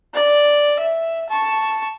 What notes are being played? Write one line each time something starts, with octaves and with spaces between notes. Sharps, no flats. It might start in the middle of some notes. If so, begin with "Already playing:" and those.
D5
E5
A5 C#6